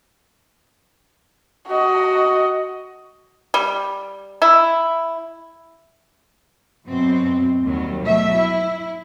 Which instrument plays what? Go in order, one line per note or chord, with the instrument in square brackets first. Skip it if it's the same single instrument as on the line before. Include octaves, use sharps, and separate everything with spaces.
[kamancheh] F#4 D#5
[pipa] G3
E4
[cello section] F#2 B2 F#3 C4
D#2 F#3 G3
B2 F#3 A3 E5
E4